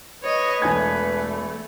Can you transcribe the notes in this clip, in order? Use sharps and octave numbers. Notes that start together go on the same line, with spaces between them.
B4 C#5 D#5
E1 A3 G#5 G#6